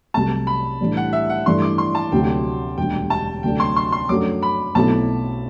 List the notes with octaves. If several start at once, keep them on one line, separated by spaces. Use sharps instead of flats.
C2 C3 F#3 A3 A5
B5
A2 E3 G3 D4
F#5
E5
F#5
G2 E3 A3 D4 C6
D6
C6
A5
D2 C3 F#3 A3 G5
E1 D2 D3 G3 G5
A5
D2 C3 F#3 A3 D4 G5
C6
C6
C6
F#2 F#3 A3 D4 D6
B5
B1 B2 A3 C4 E4 A5